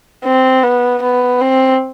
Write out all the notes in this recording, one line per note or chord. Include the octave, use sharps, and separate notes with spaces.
C4
B3
B3
C4